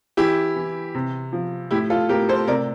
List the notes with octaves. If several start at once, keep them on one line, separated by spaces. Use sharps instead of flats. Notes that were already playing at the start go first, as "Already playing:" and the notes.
E3 E4 G4
E3
C3
F3
A2 E4 G4
F4 A4
A2 G4 A#4
A4 C5
C3 A#4 D5